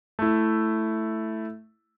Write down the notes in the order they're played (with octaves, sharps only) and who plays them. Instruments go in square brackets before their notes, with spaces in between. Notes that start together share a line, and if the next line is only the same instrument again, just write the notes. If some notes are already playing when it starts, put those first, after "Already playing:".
[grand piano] A3 E4